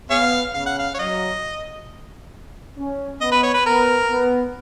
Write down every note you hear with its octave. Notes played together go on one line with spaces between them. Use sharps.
B3 G#4 C#5 F5
C#3 F5
F#5
F5
C#5
F#3 D#5
C#4
B3 D#5
B4
C#5
B4
B3 A#4
B3